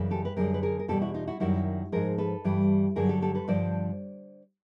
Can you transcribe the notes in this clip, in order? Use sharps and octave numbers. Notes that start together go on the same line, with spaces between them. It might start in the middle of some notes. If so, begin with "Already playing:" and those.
Already playing: F#2 C#3 E3 G3
G4 A4
B4
F#2 D3 G3 G#4 A#4
B4
G#4 A#4
A#4
E2 B2 G3 G4 A4
E4 F#4
D#4 F4
E4 F#4
F#2 D#3 G3 E4 F#4
G#2 F3 G#4 A#4
A4 B4
G2 E3 G3
G2 D3 F#3 G#4 A#4
G4 A4
G4 A4
A4 B4
G2 D3 F3 C5 D5